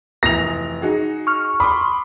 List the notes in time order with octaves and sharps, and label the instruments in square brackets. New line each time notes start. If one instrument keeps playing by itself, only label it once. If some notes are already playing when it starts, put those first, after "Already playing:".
[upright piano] F1 E3 D#6 [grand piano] A#6 F7
[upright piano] D#4 F#4 G#4
[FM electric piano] C#6 F6
[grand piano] B5 [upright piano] C6 D6 D#6